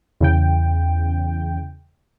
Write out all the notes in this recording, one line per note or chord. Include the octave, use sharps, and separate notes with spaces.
E2 C#3 G5